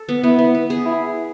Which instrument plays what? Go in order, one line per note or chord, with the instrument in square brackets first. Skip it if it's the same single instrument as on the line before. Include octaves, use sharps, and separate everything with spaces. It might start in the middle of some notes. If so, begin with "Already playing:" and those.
Already playing: [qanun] A4
B3
[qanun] B3 [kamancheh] E4
[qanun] B3
B3
G#4
[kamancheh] E4